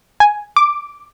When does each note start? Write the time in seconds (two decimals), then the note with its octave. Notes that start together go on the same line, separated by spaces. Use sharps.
0.20 G#5
0.56 D6